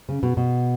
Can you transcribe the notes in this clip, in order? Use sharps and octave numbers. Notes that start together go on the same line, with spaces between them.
C#3
B2
B2